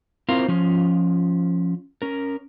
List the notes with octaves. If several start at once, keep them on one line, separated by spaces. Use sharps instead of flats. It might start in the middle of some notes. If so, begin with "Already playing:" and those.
C4 E4 F4 A#4 C5 F5
F3 C#4 F4
C#4 A#4